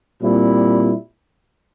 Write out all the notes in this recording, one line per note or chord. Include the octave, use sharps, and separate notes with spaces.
A#2 G3 C4 E4